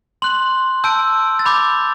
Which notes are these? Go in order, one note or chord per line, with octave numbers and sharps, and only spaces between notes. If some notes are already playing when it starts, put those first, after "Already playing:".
C6 F#6 F#7
A5 E6 G6 D7
A6
B5 D6 G6